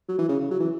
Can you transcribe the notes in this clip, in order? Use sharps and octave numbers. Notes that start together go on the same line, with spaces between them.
F#3
E3
C#3
C#3
F#3
E3